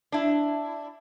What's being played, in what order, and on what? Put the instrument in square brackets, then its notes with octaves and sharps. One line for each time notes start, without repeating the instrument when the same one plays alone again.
[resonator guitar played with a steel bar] D4 E4